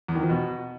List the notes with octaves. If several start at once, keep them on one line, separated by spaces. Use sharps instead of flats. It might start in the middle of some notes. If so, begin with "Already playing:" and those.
E2
D#3
F3
B2